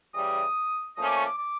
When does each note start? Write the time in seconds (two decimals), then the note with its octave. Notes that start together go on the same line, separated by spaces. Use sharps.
0.14 C#3 E3 G3 D#6
0.96 A#2 F3 A3 C#4 D#6
1.06 D6
1.16 C#6
1.26 D6
1.38 D6